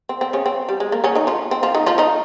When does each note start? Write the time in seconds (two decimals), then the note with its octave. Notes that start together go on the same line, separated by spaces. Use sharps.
0.09 C4
0.21 C4
0.33 C#3 C#4
0.46 C4
0.69 G3
0.80 G#3
0.92 A#3
1.04 C#3 C#4
1.15 D#3 D#4
1.27 F3 F4
1.51 C4
1.63 F3 F4
1.75 D#3 D#4
1.86 F3 F4
1.98 D#3 D#4